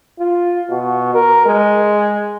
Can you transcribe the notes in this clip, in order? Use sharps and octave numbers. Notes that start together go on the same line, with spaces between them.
F4
B2
A#4
G#3